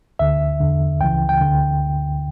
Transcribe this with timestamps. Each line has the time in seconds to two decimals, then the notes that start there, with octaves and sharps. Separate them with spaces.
0.19 D2 D3 E5
0.60 E2 D3
1.00 C#2 C#3 E3 G5
1.29 G5
1.41 D2 D3